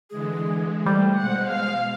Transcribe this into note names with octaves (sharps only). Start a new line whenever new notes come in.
D3 E3 G#3 G#4
G3 A3 C5
B2 G#3 F#5
F5